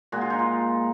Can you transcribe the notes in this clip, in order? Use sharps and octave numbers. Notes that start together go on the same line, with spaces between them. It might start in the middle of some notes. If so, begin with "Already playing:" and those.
A#2 G#3 F#4
F4
D#4
F4